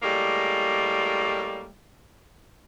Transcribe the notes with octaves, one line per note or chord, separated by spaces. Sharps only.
A2 G3 G#3 A#3